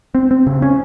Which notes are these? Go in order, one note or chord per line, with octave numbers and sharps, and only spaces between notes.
C4
C4
C#3
C#4